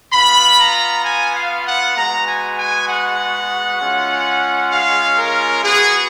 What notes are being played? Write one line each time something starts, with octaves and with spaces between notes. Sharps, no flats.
B3 F4 B5
A#5
G#5
F5
F#5
G#3 B3 F#4 A#5
G#5
G#5
F#5
G#3 C#4 F4
F5
A#4
B3 F#4 G#4